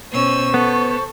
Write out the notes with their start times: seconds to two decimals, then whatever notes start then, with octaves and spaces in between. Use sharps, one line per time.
0.12 B2 C#4 C5 C#6 E6
0.54 B3 A4